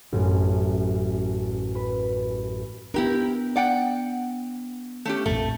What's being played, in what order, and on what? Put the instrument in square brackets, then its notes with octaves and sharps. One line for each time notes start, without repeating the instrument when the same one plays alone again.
[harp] A1 F#2
B4 B5
[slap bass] B3 D4 [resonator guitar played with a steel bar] E4 G4 A#4
[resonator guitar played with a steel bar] D5 F#5 G5
A3 C#4 G4
[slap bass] A#1 F2 A2 [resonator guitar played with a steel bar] A3